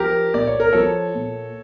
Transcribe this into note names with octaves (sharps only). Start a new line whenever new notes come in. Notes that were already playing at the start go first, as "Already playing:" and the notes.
Already playing: F3 G4 A#4
A#2 D5
C#5
A#4
F3 A4 C#5
A#2